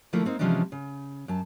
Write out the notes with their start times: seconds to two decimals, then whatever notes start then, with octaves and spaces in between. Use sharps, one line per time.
0.13 D3 F3 A3 A#3 E4
0.25 A#3 C4 D#4
0.39 C3 E3 F3 G#3 C#4 D4
0.72 C#3
1.28 F#2 A5